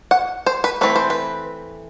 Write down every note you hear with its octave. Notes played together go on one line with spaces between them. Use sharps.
F#5
C5
B4
E3 A3 C4 B4
C5
B4